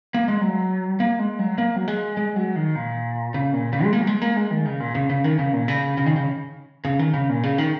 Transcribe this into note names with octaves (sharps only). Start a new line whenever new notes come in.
A#3
G#3
F#3
A#3
G#3
F#3
A#3
F#3
G#3
G#3
F#3
D#3
A#2
C#3
A#2
C#3
G#3
A#3
F#3
G#3
A#3
G#3
D#3
C#3
A#2
C#3
C#3
D#3
C#3
A#2
C#3
C#3
D#3
C#3
C#3
D#3
C#3
A#2
C#3
D#3